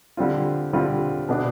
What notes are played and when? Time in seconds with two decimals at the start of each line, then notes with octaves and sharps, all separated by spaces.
0.17 D3 G3 C4 F4
0.73 D3 G3 C4 F4
1.29 B2 B3 D4